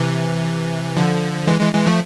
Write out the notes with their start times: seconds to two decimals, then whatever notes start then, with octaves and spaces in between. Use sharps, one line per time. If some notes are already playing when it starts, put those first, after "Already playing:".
Already playing: C3 E3
0.96 D3 F3
1.47 E3 G#3
1.60 E3 G#3
1.74 E3 G#3
1.86 F3 A3